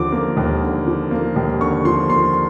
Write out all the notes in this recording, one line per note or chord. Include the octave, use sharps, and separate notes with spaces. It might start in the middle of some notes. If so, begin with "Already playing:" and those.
Already playing: D#2 D3 F3 D6
A#3
D#2
D3
F3
A#3
D#2
D3 C#6
F3 C6
A#3 C6